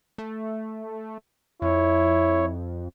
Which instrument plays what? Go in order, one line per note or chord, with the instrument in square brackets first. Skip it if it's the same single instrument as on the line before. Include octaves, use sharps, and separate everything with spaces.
[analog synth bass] A3
[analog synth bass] F2 [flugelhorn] E4 [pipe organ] C#5